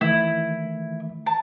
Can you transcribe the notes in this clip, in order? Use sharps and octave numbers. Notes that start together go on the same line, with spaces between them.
D#3 E3 A3 E4
A5